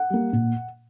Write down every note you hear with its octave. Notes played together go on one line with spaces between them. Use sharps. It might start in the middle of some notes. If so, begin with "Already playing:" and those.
Already playing: F#5
G3 A#3
A#2